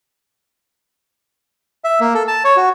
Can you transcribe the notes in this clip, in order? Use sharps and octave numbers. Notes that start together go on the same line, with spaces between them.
E5
A#3
A4
A5
C#5
F#4